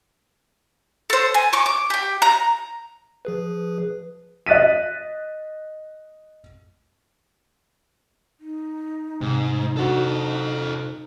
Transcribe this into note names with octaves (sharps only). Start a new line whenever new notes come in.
A4 C5
G#5
C#6 D6
D6
G4 G5
A#5
F3 G#4 B4
D#5 F#6 A6 B6 D#7
D#4
G#2 C3
D4 F#4 A4 C5